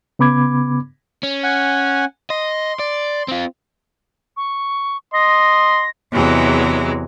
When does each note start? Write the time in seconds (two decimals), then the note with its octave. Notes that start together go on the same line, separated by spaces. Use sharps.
0.19 C#3 B3 B5 D6 G#6
1.23 C#4
1.44 F#5 G#5
2.30 D#5 C6
2.79 D5
3.28 C4 F4
4.37 C#6
5.14 D#5 C6 A#6
6.12 E2 C3 E3 F#3 G#3